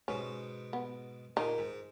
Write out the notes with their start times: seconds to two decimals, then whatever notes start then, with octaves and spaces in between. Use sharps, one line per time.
0.08 G#2 B2 C#4
0.73 B3
1.37 A#2 D#4
1.58 G#2